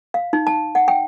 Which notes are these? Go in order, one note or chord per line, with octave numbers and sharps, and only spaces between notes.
F5
D#4
A5
F#5
G5